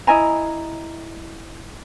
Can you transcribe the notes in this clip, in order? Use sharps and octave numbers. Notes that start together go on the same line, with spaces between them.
E4 D#5 G#5 A#5